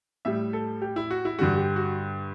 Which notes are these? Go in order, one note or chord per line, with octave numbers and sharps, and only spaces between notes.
A2 G3 E5
A4
G4
E4
F#4
E4
G2 D3 G3 F#4
G4
F#4